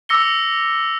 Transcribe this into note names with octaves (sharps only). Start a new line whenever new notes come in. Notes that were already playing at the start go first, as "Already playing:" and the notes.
D6 E6 A#6 C#7 G7